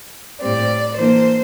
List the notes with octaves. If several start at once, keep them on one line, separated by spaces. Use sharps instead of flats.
A2 G3 C4 D5
E3 A#3 D4 C5